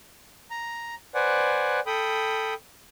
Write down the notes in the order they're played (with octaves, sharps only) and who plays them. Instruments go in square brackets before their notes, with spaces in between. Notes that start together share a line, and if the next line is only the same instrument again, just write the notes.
[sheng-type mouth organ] A#5
B4 C5 D5 F#5 G#5
A4 G5 B5 D#6